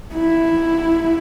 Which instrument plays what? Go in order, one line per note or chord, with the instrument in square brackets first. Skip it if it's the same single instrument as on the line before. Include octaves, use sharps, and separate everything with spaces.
[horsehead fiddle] E4